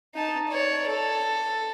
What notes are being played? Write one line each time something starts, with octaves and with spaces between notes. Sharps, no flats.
D#4 A5
C#5 D5
A4